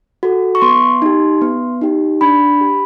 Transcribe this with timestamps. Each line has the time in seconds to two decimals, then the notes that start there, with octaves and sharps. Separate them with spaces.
0.23 F#4 A4
0.55 C#6
0.62 B3 C6
1.02 D#4 G4
1.42 B3
1.81 D#4 G4
2.21 D4 B5
2.61 G4